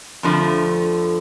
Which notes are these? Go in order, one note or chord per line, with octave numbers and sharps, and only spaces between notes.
F2 D3 F3 A3